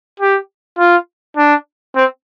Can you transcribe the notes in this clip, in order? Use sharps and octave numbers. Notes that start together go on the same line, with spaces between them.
G4
F4
D4
C4